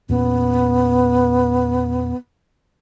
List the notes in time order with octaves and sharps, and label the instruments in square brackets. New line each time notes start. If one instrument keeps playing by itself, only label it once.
[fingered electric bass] E2 A#2 C#4 [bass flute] B3